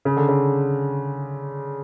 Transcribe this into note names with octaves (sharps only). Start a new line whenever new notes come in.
C#3
D3
C#3